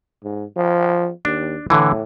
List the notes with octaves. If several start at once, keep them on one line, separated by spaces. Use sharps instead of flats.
G#2
F3
D#2 D4
A2 D3 E3